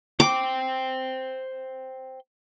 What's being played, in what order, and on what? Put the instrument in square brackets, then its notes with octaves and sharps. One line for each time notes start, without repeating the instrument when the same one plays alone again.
[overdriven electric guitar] C5 G5 [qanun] D6